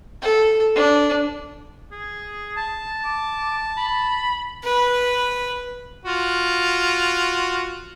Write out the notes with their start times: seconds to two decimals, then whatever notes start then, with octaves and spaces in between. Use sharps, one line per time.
0.22 A4
0.76 D4
1.92 G#4
2.56 A5
3.04 D6
3.77 B5
4.64 B4
6.05 F4 F#4